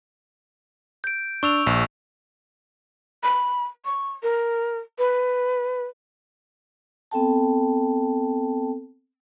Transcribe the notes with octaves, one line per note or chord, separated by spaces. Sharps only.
G6 D7
D4 C#6 E6 F7
A#1
B5
C#6
A#4
B4
B3 C4 A4 G5 A5